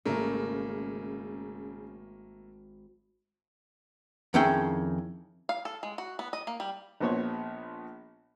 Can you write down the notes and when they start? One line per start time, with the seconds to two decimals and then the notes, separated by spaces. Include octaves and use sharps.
0.05 G#1 C#3 A3 A#3 A#4 E5
4.34 F2 D#3 C#4 E4 G#4 G5
5.49 F5
5.65 A4
5.83 G#3
5.98 F#4
6.19 B3
6.33 D#5
6.47 A#3
6.60 G3
7.00 A#1 A#2 B3 C5 C#5 C#6